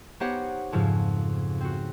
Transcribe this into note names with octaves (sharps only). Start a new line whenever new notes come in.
B3 D#4 G4 C5 C#5 F#5
F2 G#2 C#3 F3 F4
C4 F#4